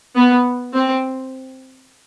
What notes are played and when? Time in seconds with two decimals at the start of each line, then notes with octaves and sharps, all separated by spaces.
0.16 B3
0.75 C4